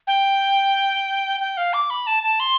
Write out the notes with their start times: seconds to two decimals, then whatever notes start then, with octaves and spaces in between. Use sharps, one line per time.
0.07 G5
1.40 G5
1.57 F5
1.73 D6
1.90 B5
2.07 A5
2.23 A5
2.40 C6